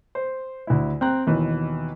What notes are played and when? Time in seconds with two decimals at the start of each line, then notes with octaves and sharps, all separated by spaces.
0.15 C5
0.67 D2 E4
1.01 C4 G5 A#5 F#6
1.27 D#2 B2 E3